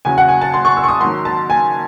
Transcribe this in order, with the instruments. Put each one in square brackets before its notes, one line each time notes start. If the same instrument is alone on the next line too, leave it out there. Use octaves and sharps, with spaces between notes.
[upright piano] E2 C#3 F#3 G#5
F#5
G#5
A5
C6
C#6
E6
C#6
D#6
G#2 D#3 F#3 C6
A5
G#5